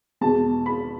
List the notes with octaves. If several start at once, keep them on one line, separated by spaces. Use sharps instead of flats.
E2 B2 G#3 A5
B5